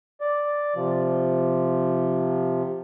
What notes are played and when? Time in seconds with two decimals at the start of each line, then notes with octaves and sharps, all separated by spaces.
0.21 D5
0.75 C3 F3